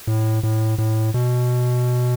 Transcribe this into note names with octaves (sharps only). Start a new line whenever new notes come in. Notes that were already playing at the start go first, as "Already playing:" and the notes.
A2
A2
A2
B2